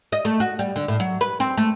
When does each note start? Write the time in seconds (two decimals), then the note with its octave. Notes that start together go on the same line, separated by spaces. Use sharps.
0.12 D#5
0.25 A3
0.40 F#4
0.59 G3
0.76 D3
0.88 A2
1.00 F#3
1.21 B4
1.40 C4
1.57 A3